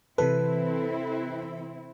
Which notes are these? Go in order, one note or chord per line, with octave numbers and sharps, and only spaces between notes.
C3 E3 C4 E4 A4 B4